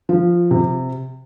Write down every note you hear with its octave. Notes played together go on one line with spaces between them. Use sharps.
F3
C3